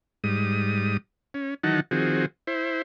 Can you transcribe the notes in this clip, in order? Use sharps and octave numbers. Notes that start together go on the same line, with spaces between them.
G#2 G3 D#6
C#4
D#3 E3 F#3 D#4 F#5 A5
D#3 F3 C4 F#4 G#4
E4 C5